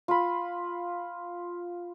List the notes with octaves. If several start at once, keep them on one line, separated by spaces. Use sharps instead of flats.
F4 B5